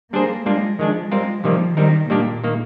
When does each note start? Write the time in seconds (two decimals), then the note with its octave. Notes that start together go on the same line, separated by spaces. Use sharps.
0.13 G3 A#3 D4 G#4 C5
0.46 G3 G#3 A#3 D4 F4
0.78 D#3 F3 G#3 D4
1.11 G3 G#3 C4 F4 A#4
1.44 C3 D#3 F3 G3 A#3
1.76 D#3 G3 C4 D#4 A#4
2.09 A#2 D#3 G3 A#3 D4 G4
2.44 D#3 A#3